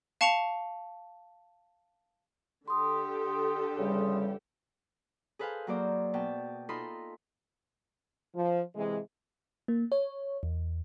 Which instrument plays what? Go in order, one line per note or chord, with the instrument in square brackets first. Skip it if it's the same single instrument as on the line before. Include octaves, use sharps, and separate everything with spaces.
[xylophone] F5 A5 C#6 C#7 E7 F7
[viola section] D3 G4 A4 [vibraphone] C6 D#6
[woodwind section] E2 C#3 G3
[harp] G#4 A4 B4 C5 F5 G#5
F#3 A#3 C5 D5
B2 G5 A5
D#4 F4 A4 B5 C6 D#6
[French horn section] F3
C3 E3 G#3
[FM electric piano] A#3
C#5
E2